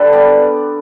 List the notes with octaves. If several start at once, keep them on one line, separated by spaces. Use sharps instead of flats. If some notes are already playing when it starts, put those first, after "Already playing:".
Already playing: D3 G4 A4 B4
G3 B3 D5